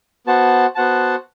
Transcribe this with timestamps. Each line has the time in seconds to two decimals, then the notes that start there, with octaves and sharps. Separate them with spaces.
0.27 B3 F#4 C5 F#5 A5
0.75 B3 F#4 C5 F#5 A5